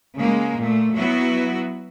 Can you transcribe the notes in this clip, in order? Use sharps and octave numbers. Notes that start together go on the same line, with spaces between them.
C#3 G#3 A#3
A#2 A3
F#3 B3 E4 F#4